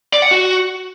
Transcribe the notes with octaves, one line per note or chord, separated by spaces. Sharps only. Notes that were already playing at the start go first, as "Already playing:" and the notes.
D5
F#5
F#4